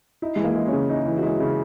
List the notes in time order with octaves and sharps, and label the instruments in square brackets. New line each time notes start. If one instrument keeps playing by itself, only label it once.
[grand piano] D#4 [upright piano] E4
[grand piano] E3 [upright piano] G#3
[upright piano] A#3
[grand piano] G#3
[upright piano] C#4
[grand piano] C#3
[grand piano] D#4 [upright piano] E4
[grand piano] E3
[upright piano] F#4
[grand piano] G#3 [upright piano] E4
[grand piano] C#3